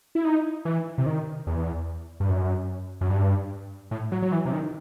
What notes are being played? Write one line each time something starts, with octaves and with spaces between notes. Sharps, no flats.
E4
D#4
E3
C3
D#3
E2
G2
F#2
F#2
G2
A2
F#3
F#3
E3
C3
D#3